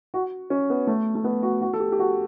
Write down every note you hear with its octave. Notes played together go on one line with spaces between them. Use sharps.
F#4
C#4
B3
A3
A3
B3
F#4
F#4
A4
G4
G4
F#4